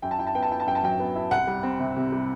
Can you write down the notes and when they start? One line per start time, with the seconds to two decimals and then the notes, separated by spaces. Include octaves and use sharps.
0.02 F#2 G5
0.11 A5
0.19 E4 G5
0.27 A5
0.35 B3 G5
0.43 A5
0.51 E4 G5
0.60 A5
0.66 F#2 G5
0.75 A5
0.83 F#3 G5
0.99 B3
1.15 E4
1.31 C2 F#5
1.47 G3
1.63 C4
1.79 C3
1.96 C3
2.12 G3